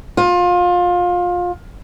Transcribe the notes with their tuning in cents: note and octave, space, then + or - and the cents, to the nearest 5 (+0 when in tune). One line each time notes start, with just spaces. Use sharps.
F4 +25